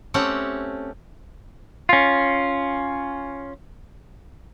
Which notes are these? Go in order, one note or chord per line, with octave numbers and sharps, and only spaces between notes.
A3 C4 C#4 G4 F#5
C#4 F4